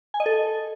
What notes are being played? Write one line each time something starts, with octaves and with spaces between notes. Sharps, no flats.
G#5
D#5
A4